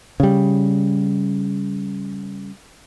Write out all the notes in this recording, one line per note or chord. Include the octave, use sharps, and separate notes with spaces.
C#3 G3